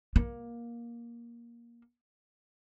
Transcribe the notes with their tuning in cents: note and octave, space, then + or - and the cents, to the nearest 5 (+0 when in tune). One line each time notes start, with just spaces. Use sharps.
A#3 +15